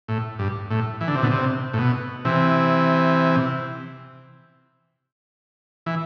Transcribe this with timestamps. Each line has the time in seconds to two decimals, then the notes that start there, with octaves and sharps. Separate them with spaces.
0.08 A2
0.39 G2
0.71 A2
1.01 E3
1.08 D3
1.15 C3
1.23 B2 D3
1.31 C3
1.73 A2
1.78 B2
2.25 C3 E3
5.86 E3